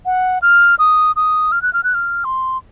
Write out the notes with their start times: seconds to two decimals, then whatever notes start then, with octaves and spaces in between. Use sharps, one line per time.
0.06 F#5
0.42 F6
0.79 D#6
1.16 D#6
1.52 F6
1.62 F#6
1.73 F6
1.84 F#6
1.94 F6
2.25 C6